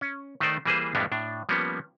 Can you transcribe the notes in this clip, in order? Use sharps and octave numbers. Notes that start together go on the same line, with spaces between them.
C#4
D#3 A3 D#4 C5 D5
E3 G3 A#3 G#4 B4 C5
F2 A2 G3 G#3 B3 D4
A2 D4
F3 G3 A#3 B3 C#4